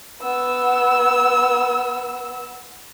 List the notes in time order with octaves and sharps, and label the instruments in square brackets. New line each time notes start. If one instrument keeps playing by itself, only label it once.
[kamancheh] B3 E6